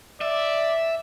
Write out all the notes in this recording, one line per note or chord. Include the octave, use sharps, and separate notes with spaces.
D5 E5